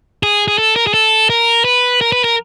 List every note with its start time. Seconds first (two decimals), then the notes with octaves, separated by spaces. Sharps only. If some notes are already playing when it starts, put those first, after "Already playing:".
0.23 G#4
0.48 G#4
0.58 A4
0.76 A#4
0.87 G#4
0.94 A4
1.30 A#4
1.65 B4
2.01 A#4
2.12 B4
2.24 A#4